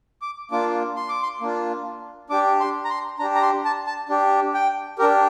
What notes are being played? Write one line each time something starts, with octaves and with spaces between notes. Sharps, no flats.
D6
A#3 D4 F4 D6
C6
D6
C6
A#3 D4 F4
D4 G4 D6
C6
A#5
C6
D4 G4 A#5
A#5
C6
A5
A5
D4 G4
G5
D4 G4 A#4